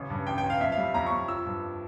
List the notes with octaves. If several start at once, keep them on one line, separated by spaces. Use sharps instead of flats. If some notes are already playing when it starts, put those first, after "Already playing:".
Already playing: A1 C#3
G2
A1 G5
G5
A1
F5
F2 E5
F5
G3
F2 A#5
C#6
F2
F3 E6
G2